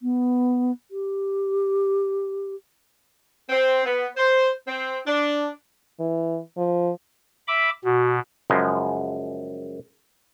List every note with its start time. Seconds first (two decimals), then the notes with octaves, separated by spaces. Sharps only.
0.02 B3
0.91 G4
3.49 C4
3.84 B3
4.16 C5
4.66 C4
5.06 D4
6.00 E3
6.57 F3
7.48 E5 B5 D6
7.84 B2 F#4
8.50 F#2 C#3 F3 G#3